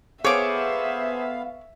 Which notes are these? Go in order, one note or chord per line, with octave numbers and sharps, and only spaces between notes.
B3 G#4 A4 C5 C#5 E5 F5 D6